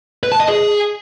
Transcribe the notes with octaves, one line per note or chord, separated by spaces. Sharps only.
B4
A5
D#5
G#4